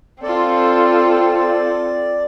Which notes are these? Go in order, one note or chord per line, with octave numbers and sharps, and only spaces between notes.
C4 F4 A4 D5